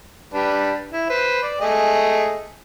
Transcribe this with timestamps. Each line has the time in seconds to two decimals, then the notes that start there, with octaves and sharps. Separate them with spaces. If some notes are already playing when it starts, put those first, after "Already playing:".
0.34 G3 D4 B4
0.92 E4
1.10 B4 C5
1.42 D5
1.61 A3 G#4 D#5